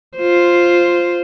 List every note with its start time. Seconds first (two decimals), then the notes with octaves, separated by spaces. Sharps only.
0.18 F4 C5